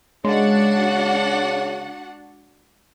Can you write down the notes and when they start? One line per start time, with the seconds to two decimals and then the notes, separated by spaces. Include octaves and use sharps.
0.25 C#3 G#3 D4 F#4 F#5